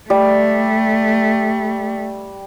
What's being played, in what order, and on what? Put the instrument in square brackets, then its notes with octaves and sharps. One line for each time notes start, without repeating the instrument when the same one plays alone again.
[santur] G3 [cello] A3